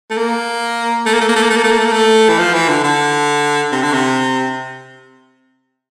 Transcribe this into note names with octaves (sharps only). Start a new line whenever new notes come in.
A3
A#3
A3
A#3
A3
A#3
A3
A#3
A3
A#3
A3
A#3
A3
A#3
A3
E3
F3
E3
D3
D3
C3
D3
C3